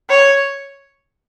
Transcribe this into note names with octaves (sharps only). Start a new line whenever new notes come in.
C#5